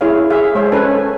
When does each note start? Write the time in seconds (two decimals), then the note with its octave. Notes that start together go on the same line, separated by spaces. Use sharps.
0.01 E4 G#4 C#5 F5
0.30 G#4 E5 F5
0.55 G#3 C5 C#5
0.72 C#4 A4 B4 C#5 G#5